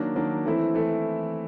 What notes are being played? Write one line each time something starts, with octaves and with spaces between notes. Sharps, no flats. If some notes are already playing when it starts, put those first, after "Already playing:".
Already playing: D#3 F#3 A#3 D4
D#3 F#3 A#3 D4
E3 A3 C4 E4
E3 A3